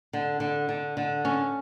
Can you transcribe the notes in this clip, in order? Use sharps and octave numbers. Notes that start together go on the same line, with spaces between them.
D3
D3
D3
D3
C#4